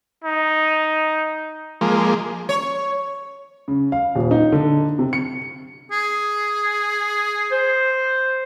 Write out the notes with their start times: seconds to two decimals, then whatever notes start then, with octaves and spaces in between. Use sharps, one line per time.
0.24 D#4
1.81 F3 G#3 A#3
2.49 C#5
3.68 C#3
3.92 F5
4.15 D#1
4.31 D#4
4.52 D3
4.99 C3
5.13 C#7
5.91 G#4
7.52 C5